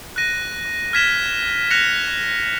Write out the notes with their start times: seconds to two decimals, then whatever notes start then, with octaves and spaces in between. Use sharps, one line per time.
0.16 F#6 A#6 D#7
0.93 F6 G#6 B6 E7 G7
1.71 F#6 A#6 C#7 F7